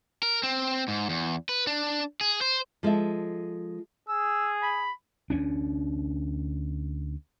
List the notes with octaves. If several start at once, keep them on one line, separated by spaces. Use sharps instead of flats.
A#4
C4
G#2
E2
B4
D4
G#4
C5
F3 G#3 A4 E5
G#4 E6
B5
D2 C#4 D4